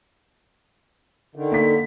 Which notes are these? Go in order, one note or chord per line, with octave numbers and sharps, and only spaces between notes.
D3 D#3
A#3 B6